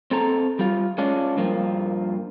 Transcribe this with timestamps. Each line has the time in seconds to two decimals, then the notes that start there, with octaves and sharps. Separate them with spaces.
0.11 C4 A4 A#5
0.59 G3 F4
0.98 G#3 C#4 D4 F4
1.37 G2 F3 A#3